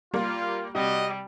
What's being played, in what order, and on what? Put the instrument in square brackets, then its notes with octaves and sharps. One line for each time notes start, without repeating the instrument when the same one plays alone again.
[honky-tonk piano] G3 A#3 [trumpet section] F4
[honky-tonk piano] C3 [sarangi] G3 [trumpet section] F#4 D#5